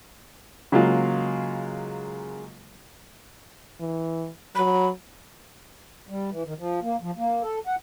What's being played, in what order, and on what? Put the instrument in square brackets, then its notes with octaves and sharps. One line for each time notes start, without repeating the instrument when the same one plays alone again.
[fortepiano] C#3 F#3 G#3 A#3 F4
[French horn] E3
[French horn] F#3 [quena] B5
[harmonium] G3
E3
D#3
F3
A#3
F3
A#3
A4
F#5